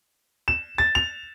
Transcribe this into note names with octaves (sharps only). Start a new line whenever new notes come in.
E7
A6
F7